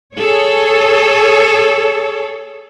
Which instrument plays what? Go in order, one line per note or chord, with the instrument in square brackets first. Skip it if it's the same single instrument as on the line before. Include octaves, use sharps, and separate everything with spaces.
[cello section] G#4 A4 C#5